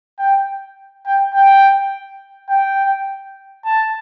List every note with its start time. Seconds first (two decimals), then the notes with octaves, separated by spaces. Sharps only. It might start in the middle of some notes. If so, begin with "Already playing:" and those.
0.19 G5
1.06 G5
1.34 G5
2.49 G5
3.65 A5